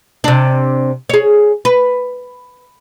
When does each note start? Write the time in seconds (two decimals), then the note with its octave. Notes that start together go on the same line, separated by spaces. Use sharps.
0.24 C3 D4
1.09 G#4 C#5
1.65 B4